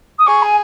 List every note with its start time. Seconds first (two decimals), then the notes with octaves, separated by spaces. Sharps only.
0.18 D#6
0.26 G#4 C#6
0.42 G#5